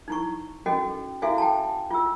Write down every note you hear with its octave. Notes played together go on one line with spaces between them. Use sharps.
D#4 E4 C#6
C#4 F#4 A4 D#5 G5
E4 F#4 A4 E5 F5 G#5
G5 A5
F4 E6